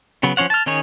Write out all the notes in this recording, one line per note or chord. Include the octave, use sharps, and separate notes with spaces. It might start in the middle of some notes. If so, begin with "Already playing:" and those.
C#3 F#3 B3
F3 C#4 C#5 F#5
A5 F6
D#3 C#4 D#4 G#4 C#5